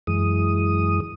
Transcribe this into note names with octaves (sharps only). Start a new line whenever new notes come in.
F#2 E3 G#3 D#6